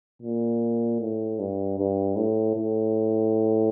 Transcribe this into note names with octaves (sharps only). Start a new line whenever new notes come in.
A#2
A2
G2
G2
A2
A2